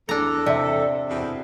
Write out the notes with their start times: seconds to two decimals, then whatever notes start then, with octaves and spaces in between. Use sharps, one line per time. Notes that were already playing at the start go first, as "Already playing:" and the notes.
0.09 E2 D4 A4 A#5
0.46 C3 D5 E5
1.10 E2 B2 C4